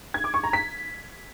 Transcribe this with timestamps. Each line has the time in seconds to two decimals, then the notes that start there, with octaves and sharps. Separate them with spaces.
0.14 G#6
0.24 D6
0.34 C#6
0.44 A#5
0.53 B6